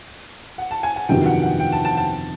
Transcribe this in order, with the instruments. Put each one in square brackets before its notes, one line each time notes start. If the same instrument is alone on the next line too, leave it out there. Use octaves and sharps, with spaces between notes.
[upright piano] F#5
A5
G#5
G#5
[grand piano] G1 F2 C3 D#3 F#3 [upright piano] G5
[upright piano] F#5
F#5
G5
A5
A5
A5